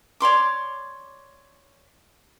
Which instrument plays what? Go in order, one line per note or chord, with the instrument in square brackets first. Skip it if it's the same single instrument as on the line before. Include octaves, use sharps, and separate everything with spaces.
[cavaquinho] C#5 D5 C6 D6